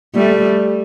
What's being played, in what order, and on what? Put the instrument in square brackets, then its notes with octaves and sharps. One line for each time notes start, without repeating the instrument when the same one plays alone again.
[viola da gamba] G3 A3